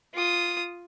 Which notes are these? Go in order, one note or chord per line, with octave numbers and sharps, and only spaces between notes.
F4 D#6